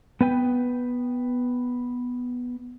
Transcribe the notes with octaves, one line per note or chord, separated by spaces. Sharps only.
B3 B4 G5